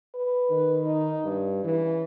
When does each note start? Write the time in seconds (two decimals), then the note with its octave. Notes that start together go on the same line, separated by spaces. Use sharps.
0.15 B4
0.50 D#3
0.86 D#4
1.24 G2
1.64 C#3 E3